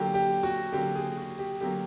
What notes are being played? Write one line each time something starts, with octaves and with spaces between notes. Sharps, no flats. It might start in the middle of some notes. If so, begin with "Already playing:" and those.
Already playing: D3 F#3 A#3 G4
G4
F#4
D3 F#3 A#3 G4
G#4
F#4
G4
D3 F#3 A#3 G4